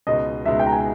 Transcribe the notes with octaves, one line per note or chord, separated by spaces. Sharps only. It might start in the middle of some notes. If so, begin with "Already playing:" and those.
C#2 B2 G#3 D#4 D#5
C#2 B2 G#3 D#4 E5
G5
A#5
G#5